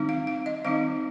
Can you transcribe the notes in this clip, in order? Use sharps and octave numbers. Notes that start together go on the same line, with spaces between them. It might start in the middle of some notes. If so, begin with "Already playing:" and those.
Already playing: D#3 G3 C4 D#4
F5
F5
D#5
D#3 G3 C4 D#4 F5